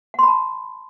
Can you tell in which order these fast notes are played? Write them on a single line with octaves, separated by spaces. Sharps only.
F#5 C6 B5 A5